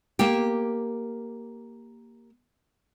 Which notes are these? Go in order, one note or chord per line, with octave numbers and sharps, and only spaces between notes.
A#3 G4